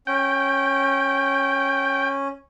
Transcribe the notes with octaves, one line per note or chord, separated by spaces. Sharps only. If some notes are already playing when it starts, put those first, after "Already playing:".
C#4 G5